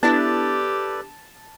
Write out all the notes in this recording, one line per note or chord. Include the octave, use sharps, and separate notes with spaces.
B3 D4 E4 G4 A4 B4 D5 A5